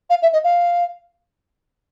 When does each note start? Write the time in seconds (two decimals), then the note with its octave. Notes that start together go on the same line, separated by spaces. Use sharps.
0.10 F5
0.22 E5
0.33 D#5
0.44 F5